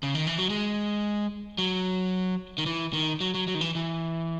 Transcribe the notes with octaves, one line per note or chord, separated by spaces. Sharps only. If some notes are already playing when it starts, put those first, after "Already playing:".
C#3
D#3
E3
F#3
G#3
F#3
D#3
E3
D#3
F#3
F#3
F#3
D#3
E3
E3